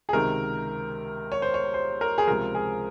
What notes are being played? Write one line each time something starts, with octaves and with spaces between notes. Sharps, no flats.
G#4
C#2 C3 D#3 A#4
C#5
C5
C#5
C5
A#4
G#4
C#2 C3 F3 A#4
G#4